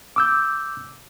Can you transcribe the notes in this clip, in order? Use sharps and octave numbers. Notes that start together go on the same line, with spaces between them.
D6 E6 G6